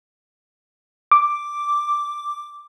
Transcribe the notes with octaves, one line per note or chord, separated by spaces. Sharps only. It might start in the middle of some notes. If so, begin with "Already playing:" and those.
D6